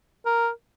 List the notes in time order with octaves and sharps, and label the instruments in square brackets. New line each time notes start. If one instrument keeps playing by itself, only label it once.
[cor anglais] A#4